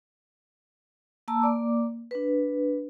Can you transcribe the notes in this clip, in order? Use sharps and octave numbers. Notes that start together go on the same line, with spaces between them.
A#3 A5 A#5 E6
A#3 D5 D6
D4 B4